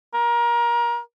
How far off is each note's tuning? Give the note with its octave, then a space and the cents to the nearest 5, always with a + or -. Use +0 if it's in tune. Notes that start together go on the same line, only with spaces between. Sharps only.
A#4 +25